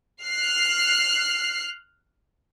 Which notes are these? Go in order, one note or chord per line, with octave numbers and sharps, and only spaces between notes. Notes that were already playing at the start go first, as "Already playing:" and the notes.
F6 F#6 C7